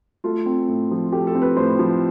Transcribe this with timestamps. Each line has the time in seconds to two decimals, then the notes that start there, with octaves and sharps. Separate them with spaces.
0.24 A3 F4
0.46 C4
0.68 A2
0.91 F3
1.12 A3 G4
1.27 A4
1.35 C4
1.42 B4
1.57 A2 C5
1.79 F3